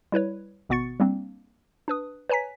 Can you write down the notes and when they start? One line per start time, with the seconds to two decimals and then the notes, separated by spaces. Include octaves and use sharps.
0.12 G3 E4 B4 C#5
0.69 G#1 B2 B3 C#6 A6 C#7
1.00 G3 A#3 C4 D4
1.88 D4 B4 D#6
2.30 B4 C#5 G#5 A#5 B6